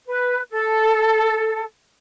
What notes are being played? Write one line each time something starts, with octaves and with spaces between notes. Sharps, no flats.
B4
A4